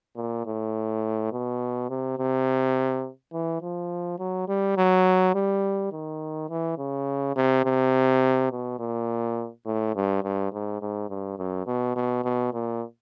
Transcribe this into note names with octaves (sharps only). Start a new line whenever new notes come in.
A#2
A2
B2
C3
C3
E3
F3
F#3
G3
F#3
G3
D#3
E3
C#3
C3
C3
B2
A#2
A2
G2
G2
G#2
G#2
G2
F#2
B2
B2
B2
A#2